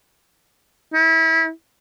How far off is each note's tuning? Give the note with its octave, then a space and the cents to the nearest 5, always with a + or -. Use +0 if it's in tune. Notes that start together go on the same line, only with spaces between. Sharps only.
E4 -25